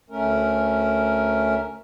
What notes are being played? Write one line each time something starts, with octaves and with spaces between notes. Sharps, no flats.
D2 A3 C#4 A#4